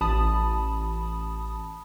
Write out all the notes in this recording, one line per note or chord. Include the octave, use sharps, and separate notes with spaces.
A1 A5 B5 D#6